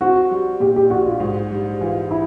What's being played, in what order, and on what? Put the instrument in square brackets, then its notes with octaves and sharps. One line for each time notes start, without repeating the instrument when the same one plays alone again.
[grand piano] C4 [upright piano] F#4
[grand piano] G3
[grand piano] A#2 [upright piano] G4
[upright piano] G4
[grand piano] A#1 [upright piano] F#4
[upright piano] F4
[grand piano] G#2
G3
[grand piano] E3 [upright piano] F4
[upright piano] E4